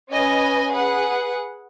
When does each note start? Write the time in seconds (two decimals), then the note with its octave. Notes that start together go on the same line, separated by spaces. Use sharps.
0.12 C#4 B4 D#5 G#5
0.72 G#4 B4 F#5